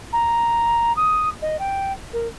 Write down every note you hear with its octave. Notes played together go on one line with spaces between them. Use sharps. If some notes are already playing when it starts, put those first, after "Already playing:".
A#5
D#6
D#5
G5
A#4